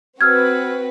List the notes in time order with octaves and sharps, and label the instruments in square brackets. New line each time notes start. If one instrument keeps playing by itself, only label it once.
[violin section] C4 F#4 B4 [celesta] E6 F6 G#6